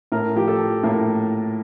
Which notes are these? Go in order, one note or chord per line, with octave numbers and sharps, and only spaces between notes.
A2 A#4
F3 G4
A4
F3
A2 A#3